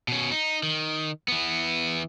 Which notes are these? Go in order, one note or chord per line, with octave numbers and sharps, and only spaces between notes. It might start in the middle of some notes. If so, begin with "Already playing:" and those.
B2 C#4
D#4
D#3
E3 B3